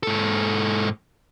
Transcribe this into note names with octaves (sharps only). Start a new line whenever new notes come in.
G#2 A4